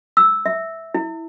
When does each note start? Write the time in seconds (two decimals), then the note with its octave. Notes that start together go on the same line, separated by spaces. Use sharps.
0.17 E6
0.46 E5
0.94 E4